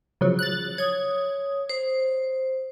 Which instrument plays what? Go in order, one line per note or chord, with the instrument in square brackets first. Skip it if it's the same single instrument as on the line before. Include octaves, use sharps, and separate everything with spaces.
[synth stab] C#3 F3 F#3
F#6 A6
[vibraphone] C#5 D#6 [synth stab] G#6
[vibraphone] C5